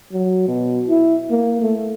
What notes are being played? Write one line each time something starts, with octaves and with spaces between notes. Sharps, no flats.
F#3
B2
E4
A#3
A3